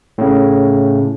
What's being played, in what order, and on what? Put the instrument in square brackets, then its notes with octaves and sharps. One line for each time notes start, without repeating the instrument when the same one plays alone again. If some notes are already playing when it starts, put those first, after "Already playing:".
[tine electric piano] A2 C#3